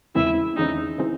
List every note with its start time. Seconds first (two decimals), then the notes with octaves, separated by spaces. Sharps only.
0.15 E2 C#3 E3 G#3 C4 E4
0.56 E2 C#3 E3 G#3 C4 D#4
0.98 C#3 E3 G#3 C4